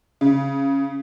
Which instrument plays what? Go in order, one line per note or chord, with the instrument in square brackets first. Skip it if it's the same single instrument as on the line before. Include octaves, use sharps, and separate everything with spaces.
[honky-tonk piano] C#3